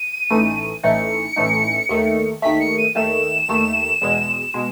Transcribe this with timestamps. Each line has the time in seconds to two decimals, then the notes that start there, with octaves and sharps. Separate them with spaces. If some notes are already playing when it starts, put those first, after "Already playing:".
Already playing: D#7
0.31 A1 A2 E3 A3 D#4
0.83 A1 A2 E3 A3 D#4 C#7
1.36 A1 A2 E3 A3 D#4
1.89 D#2 D#3 A3
2.42 D#2 D#3 A3 B6
2.60 C#7
2.78 D#7
2.95 D#2 D#3 A3 E7
3.49 D#2 D#3 A3
4.02 E2 B2 G#3
4.54 B2 G#3